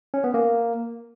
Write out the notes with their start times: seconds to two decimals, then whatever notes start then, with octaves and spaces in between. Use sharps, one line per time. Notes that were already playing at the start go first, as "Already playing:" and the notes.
0.14 C#4
0.24 B3
0.34 A#3